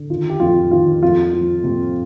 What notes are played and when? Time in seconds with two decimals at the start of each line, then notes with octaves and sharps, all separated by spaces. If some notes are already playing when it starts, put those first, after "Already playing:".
Already playing: D3
0.10 D#3 F4
0.30 G4
0.40 F2 F4
0.71 D#3 F4
1.02 F2 F4
1.34 F3
1.64 C3